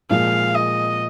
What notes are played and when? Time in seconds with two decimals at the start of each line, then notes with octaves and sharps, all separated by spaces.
0.10 A#2 F3 G#3 F5
0.55 D#5